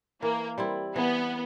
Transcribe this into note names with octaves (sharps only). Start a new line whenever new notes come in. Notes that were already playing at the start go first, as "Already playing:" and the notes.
E3 A#3
G3 C4 E4
E3 B3